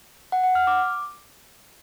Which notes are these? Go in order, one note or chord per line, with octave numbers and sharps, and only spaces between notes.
F#5
F#5
F6
D6